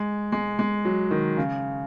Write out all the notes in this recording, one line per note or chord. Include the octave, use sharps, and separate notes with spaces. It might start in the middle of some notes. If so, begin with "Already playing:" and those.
Already playing: G#3
G#3
G#3
F#3
D#3
C#3